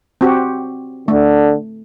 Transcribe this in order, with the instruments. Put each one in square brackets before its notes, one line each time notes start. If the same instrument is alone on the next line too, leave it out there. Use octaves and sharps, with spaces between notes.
[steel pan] C4 F#4 G4
[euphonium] D3 [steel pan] A3